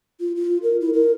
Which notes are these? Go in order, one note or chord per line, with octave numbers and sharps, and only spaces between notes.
F4
F4
A#4
E4
A#4